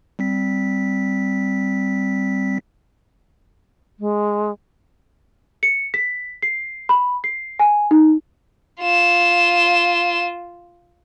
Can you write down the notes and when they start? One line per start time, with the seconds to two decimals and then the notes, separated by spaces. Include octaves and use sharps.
0.19 G3 C4 B6
3.99 G#3
5.63 C#7
5.94 B6
6.42 C7
6.89 B5
7.24 C7
7.59 G#5
7.91 D#4
8.81 F4 E7